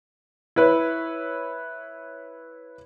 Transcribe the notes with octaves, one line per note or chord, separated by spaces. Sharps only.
E4 B4 C#5